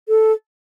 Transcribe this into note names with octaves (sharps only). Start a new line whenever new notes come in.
A4